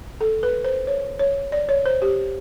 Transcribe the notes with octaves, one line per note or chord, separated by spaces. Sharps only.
A4
B4
C5
C#5
C#5
D5
C#5
C5
G4